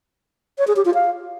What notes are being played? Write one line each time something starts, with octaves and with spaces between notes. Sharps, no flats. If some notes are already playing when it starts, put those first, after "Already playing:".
C#5
G#4
G4
F4
F5